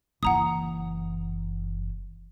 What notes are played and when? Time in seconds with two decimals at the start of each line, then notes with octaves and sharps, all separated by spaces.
0.23 F#1 E3 F#5 A#5 D#6